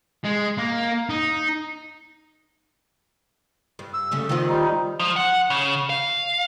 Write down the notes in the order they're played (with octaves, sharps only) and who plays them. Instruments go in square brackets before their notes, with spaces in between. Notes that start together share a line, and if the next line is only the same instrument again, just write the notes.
[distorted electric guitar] G#3
A#3
D#4
[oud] G2
[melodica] E6
[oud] C#3 G3 A3
D#3 F3 F4
[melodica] G3 D#4
[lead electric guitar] F3
F#5
C#3
F5